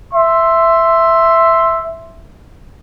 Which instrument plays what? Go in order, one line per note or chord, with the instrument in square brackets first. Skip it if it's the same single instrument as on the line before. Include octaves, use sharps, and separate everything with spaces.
[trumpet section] E5 C6